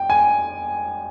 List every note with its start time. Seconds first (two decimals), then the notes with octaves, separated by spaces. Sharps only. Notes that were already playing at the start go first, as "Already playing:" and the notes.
Already playing: G5
0.10 G#5